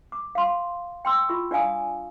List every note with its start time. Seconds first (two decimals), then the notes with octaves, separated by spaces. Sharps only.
0.12 D6
0.35 F5 C6
1.05 G5 C6 E6
1.29 F4 C#6
1.51 D4 D5 F5 G#5 D#6